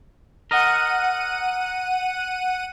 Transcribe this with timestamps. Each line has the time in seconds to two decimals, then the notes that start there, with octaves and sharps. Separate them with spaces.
0.51 A#4 D#5 F#5 D#7